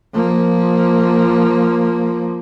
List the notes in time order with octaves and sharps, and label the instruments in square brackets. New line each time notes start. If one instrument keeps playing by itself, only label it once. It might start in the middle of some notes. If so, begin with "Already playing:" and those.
[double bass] F3 A#3